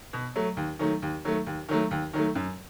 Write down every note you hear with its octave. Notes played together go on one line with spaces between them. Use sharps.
B2
F#3 A3
D#2
D#3 F#3 A3
D#2
D#3 F#3 A3
D#2
D#3 F#3 A3
D#2
D#3 F#3 A3
F#2